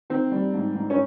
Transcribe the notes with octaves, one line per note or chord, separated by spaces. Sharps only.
D#3 C4
G3
G#2
G#2
C#4